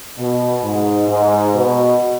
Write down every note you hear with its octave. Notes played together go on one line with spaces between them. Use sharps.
B2
G#2
G#2
B2